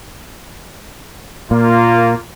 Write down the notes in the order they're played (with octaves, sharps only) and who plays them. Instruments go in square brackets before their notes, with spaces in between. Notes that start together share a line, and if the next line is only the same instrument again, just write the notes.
[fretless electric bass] A#2 [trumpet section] A#3 F4